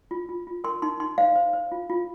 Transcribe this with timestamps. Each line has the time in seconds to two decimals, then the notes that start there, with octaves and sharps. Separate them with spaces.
0.11 F4
0.29 F4
0.47 F4
0.64 A#4 C6
0.82 D#4 C6
1.00 D#4 C6
1.18 C5 F5
1.36 C5
1.53 C5
1.72 F4
1.90 F4